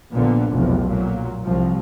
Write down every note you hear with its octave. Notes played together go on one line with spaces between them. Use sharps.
A#1 A#2 D3 B3
F1 B1 E2
A#2 F#3
C2 F3